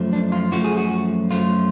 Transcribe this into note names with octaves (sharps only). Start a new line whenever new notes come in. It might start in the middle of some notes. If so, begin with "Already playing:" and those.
Already playing: F#2 F3 A3
D4
F4
F#2 F3 A3 F#4
G#4
F#4
F#2 F3 A3 F4